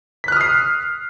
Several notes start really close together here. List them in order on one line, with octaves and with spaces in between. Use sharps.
B6 F#6 F6 D#6 C7